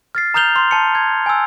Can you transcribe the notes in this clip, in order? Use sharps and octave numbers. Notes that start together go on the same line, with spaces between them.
F6 A6 C7
A#5 D#6 F6 G6 F7 G7
C6
A5 C#7
G#6
G#5 E6